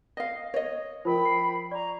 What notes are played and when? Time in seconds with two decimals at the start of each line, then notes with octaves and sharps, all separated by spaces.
0.17 D#5 F5
0.54 C#5 D#5
1.05 F3 A#4 C5 G5 B5
1.25 C7
1.71 D5 A#5 C#6